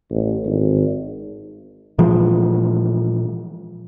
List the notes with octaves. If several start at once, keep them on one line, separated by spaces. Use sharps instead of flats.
A1
G#1
A#2 E3 F3 G#3